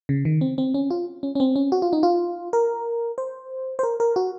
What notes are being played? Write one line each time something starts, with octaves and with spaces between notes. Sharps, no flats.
C#3
D#3
C4
C4
C#4
F4
C#4
C#4
C4
C#4
F#4
F4
D#4
F4
A#4
C5
C5
A#4
A#4
F#4